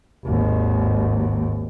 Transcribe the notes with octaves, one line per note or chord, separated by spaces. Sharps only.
G#1 D#2